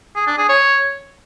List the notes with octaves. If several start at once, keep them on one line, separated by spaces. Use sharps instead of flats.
G#4
D4
G#4
C#5